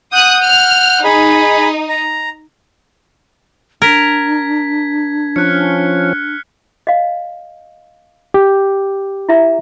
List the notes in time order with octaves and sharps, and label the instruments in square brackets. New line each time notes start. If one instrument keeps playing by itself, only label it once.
[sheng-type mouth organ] F#5 G6 [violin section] D#6 F#6
[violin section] F6
[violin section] D#4 [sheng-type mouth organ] G#4 B5
[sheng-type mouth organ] A#5
[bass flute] D4 [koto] A#4 [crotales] G#6 B6
[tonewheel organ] F3 C#4 [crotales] F6 F#6 C#7
[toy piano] D#5 F5
[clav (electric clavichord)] G4
[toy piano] E4 E5 A#5